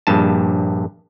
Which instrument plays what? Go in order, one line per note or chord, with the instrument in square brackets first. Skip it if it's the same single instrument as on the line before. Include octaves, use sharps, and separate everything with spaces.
[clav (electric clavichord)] A#1 G2 A5